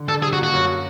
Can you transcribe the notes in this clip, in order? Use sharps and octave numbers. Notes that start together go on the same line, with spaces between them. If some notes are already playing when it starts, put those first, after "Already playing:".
Already playing: D3
D4 A4
G3 G#4
F#4
A#3
F#4
F#2